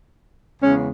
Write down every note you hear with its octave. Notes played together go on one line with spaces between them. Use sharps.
E2 C#3 G#3 C#4